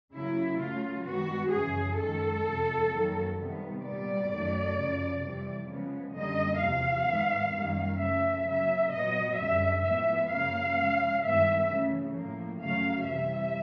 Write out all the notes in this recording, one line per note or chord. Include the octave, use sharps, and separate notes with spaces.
C#3 F#3 A#3 E4
C#3 F#3 A3 F4
G2 D#3 G#3 B3 F#4
F#2 C#3 E3 G#4
F#2 D#3 G#3 A4
F2 C3 F3
F#2 D#3 F#3 A#3
C3 D#3 G3 B3
A#2 G3 B3 D5
F#2 D#3 F#3 A3
F#2 C#3 F3
F2 C3 E3 G3
C#3 F3 G#3 B3
F#2 D3 G3 A#3 D#5
E2 C3 F3 F5
G#2 D#3 G#3 B3
F#2 D#3 G3 A#3
C#3 F3 A3 E5
C#3 F#3 A#3 E5
A#2 F#3 B3 D#5
F#2 D3 G3 E5
A2 F3 G#3 B3 E5
F#2 C#3 F3 A#3 F5
C#3 F3 G#3
G2 D#3 G#3 B3 E5
C#3 E3 A3
A2 F3 A#3
F#2 C#3 F#3 A3 F5
C3 E3 G3 E5